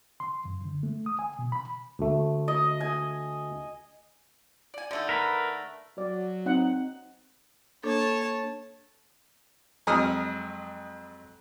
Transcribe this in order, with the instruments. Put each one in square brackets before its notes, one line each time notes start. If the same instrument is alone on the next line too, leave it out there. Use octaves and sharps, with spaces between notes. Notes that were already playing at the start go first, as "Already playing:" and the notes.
[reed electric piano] C6
F#2
D3
A3
D#6
G#5
B2
B5
[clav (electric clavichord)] D2 A3
[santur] D#5
G#5
[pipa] D5 G#5
D3 A3 D#4
[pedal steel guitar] A#4 B4
[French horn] F#3 [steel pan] D5
[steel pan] C4 D#4 F#5
[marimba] A#3 D4 A4 [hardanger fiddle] C#5 A5
[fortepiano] F2 F#3 G#3 D#6 F6